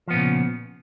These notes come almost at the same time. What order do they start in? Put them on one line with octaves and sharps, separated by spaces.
F3 B3 A#2 C#3